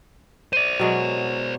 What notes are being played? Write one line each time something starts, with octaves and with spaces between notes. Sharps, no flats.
C5 D5 D#7
B2 F#3 G#3